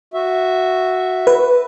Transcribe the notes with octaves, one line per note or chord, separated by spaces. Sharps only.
F#4 E5
B4